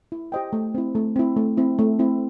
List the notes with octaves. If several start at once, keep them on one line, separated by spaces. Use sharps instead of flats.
E4
G4 C5 D#5 G5
A3
C4 E4
A3
C4 E4
A3
C4 E4
A3
C4 E4